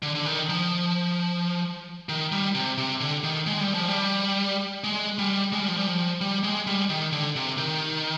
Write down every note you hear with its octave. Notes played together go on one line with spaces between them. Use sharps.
D3
D3
D#3
F3
D#3
G3
C3
C3
D3
D#3
G#3
G3
F3
G3
G#3
G3
G#3
G3
F3
G3
F3
G3
G#3
G3
D#3
D3
C3
D#3